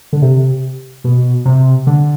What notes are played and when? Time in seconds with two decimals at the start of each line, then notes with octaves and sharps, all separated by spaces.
0.13 D3
0.22 C3
1.04 B2
1.45 C3
1.87 D3